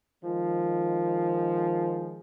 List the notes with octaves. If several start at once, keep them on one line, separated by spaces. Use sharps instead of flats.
D#3 F3 G#3